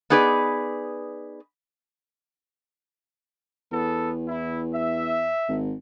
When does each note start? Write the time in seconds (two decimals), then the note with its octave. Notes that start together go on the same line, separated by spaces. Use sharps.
0.10 B3 D#4 G#4 B4 D5
3.72 E2 B3 A4
4.28 E4
4.73 E5
5.49 G#1